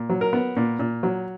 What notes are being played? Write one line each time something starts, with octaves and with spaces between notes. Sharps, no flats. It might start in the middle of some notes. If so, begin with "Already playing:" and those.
Already playing: A#2
F#3
A#4
B3
A#2
A#2
F#3